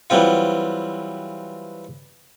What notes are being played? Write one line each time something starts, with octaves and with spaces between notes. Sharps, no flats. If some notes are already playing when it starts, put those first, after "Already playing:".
E3 F#3 G3 C4 F4